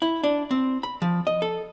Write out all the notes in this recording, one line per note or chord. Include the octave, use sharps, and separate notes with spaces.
E4
D4
C4
B5
F3
D#5
A4